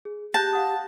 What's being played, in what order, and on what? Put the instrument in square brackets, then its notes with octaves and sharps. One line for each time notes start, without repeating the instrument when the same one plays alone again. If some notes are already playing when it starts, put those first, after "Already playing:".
[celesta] G#4
[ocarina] G4 [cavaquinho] A5 [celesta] F#6 G6 A#6
[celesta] F5 F#5 D#6